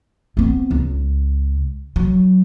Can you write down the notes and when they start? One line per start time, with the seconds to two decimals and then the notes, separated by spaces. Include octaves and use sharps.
0.37 B3 C4
0.71 C#2
1.96 F#3